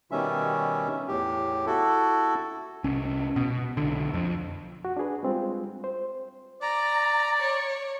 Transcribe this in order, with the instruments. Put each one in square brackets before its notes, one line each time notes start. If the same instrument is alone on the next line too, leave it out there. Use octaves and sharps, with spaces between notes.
[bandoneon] B2 D#3 G3 C#4 E5
E2 A2 G4
E4 F#4 A4
[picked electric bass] C2 C#4
B2
B1 D3
F2
[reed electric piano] F#4
D4 F#4 G#4 B4
G3 G#3 C4 F4 G#4
C5
[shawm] D5 [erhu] A#5
[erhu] C#5